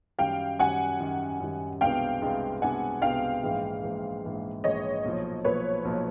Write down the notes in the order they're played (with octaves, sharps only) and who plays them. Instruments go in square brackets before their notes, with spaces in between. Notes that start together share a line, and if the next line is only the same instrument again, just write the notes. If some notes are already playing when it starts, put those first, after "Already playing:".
[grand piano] F#2 D#3 G3 [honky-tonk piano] F5 G5
[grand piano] F#2 D#3 G3 [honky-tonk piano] F#5 G#5
[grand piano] F#2 D#3 G3
F#2 D#3 G3
[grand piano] C2 B2 G#3 B3 D4 [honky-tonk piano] F5 G5
[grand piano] C2 B2 G#3 B3 D4
[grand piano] C2 B2 G#3 B3 D4 [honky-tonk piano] F#5 G#5
[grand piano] C2 B2 G#3 B3 D4 [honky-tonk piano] F5 G5
[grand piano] A#1 G#2 E3 G#3
A#1 G#2 E3 G#3
A#1 G#2 E3 G#3
[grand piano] A#1 G#2 E3 G#3 [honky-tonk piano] C#5 D#5
[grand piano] B1 A#2 F3
[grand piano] B1 A#2 F3 [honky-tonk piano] B4 C#5
[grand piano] B1 A#2 F3